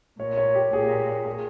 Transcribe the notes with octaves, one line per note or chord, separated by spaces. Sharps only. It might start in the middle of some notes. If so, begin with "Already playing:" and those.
A#2 C#5
C#5
G4
A#2 G#4
G#4